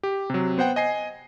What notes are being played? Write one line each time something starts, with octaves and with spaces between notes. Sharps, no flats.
G4
C3 F#3
B3 C5 F#5 G5
D#5 G#5 C7